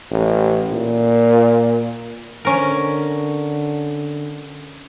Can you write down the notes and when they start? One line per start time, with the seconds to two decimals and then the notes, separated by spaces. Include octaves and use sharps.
0.11 A1
0.72 A#2
2.45 D3 C#4 A#4